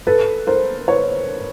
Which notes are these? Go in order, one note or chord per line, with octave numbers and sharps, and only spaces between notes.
A4 B4
A#4 C5
B4 C#5